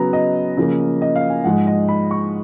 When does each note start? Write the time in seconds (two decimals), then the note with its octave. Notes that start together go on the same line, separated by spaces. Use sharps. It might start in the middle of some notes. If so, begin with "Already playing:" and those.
Already playing: C#3 F#3 B3 A#5
0.13 D#5
0.57 C#3 F3 A#3
1.02 D#5
1.16 F5
1.30 G#5
1.44 G#2 F3 G#3 F#5
1.67 D#5
1.88 B5
2.11 C#6